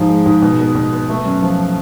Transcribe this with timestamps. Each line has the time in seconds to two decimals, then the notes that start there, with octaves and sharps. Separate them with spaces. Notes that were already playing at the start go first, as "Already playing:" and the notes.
Already playing: G#2 F3
0.09 G#3
0.26 G#2
0.42 B2
0.59 B3
0.75 B2
0.92 B3
1.09 A3
1.25 F#2
1.42 F3